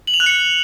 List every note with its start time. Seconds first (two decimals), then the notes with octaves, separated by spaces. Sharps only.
0.07 F#7
0.14 F7
0.20 F#6
0.26 C#7